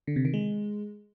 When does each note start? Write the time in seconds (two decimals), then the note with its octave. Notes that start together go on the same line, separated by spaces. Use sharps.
0.07 D3
0.16 C3
0.25 D#3
0.34 G#3